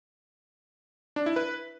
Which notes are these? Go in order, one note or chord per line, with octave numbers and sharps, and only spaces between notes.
D4
E4
B4